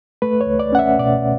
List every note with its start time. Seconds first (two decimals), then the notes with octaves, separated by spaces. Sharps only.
0.22 A3 B4
0.41 C#5
0.47 C#2
0.59 D5
0.72 C#4 F#5
0.79 E5
0.98 B2 D5